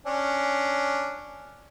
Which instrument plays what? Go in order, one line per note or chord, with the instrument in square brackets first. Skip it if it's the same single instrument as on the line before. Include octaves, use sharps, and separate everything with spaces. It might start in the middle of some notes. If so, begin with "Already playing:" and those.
[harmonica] C#4 D4